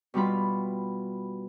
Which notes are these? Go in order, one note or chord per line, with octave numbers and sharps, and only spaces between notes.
B2 G3 F4 B5